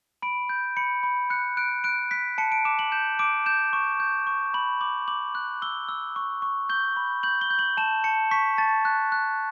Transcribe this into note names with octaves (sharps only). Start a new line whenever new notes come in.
B5 D7
G6
B5 C#7
B5
F#6 C#7
F#6 D7
F#6 D7
F#6 B6
A5 C#7
D7
D6 E7
F#7
G6 E7
D6 D7
G6 E7
C#6
G6
C#6
B5 F#7
D6 F#7
D6 F#7
F#6
E6 G7
E6
C#6
C#6
G6 G7
B5
G6 F#7
G7
G6
F#7
A5 E7
A5 C#7
C#6 B6
A5 A6
F#6
F#6